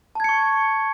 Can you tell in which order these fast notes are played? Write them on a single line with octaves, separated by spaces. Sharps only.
A5 G#6 C#7 C#6